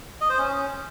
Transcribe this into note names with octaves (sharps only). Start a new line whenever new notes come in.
D#5
C5
C#4